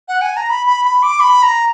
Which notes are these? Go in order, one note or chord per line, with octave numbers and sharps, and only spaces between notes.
F#5
G#5
A#5
B5
B5
B5
D6
B5
A#5